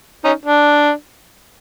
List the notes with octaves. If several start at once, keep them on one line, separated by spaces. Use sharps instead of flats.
C#4 D#4
D4